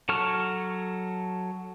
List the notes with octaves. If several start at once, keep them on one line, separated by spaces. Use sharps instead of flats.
F#3 A4 C#6 F6